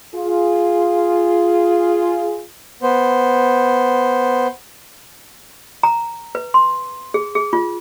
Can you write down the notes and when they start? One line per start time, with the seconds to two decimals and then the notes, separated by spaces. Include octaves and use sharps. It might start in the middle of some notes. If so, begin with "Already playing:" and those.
0.15 F4 G#4
2.83 B3 C5
5.83 A#5
6.35 B4
6.54 C6
7.14 G#4
7.35 G#4
7.53 F4